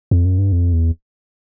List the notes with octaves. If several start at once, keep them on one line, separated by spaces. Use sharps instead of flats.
F2
F#2
G2
F2
E2